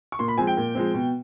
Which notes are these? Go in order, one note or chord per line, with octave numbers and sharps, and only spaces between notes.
C#6
A#2 C6
B5
F3 G#3 C4 G#5
G5
A#2
F3 G#3 C4
B2